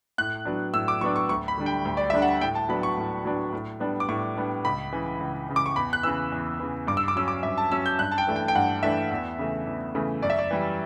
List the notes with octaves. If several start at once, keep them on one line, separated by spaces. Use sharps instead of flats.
A2 F#6
F#3 B3 D4
A2 E6
D6
F#3 B3 D4 C#6
C#6
D2 C#6
B5
D3 G3 D4
G5
D2
D5
D3 G3 D4 E5
F#5
A2 G5
A5
F#3 B3 D4 B5
C#6
A2
F#3 B3 D4
A2
G3 B3 D4
D6
A2 C#6
G3 B3 D4
C#2 B5
C#3 E3
C#2
C#3 E3
D6
C#6
E2 B5
F#6
C#3 E3 E6
E2
C#3 E3
G2 D6
E6
D6
F#3 C#4 E6
D6
G2 E5
A5
F#3 C#4 E6
G6
G2 F#6
A5
G5
E3 A3 D4
G5
G5
G2 F#5
E3 A3 D4 E5
E2
C#3 E3 A3
E2
C#3 E3 A3
F#2 D5
E5
D5
E3 G3